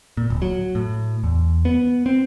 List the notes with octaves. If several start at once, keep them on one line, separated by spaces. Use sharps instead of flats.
A#2
D1
F#3
A2
E2
B3
C4